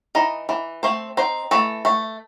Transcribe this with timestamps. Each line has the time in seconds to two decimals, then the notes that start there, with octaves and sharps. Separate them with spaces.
0.15 E3 D#4 D#5
0.49 E3
0.83 A3 C4 C5
1.17 C4 D#4 C5
1.51 E3 A3 A4
1.85 A3